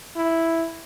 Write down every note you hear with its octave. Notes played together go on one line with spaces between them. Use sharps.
E4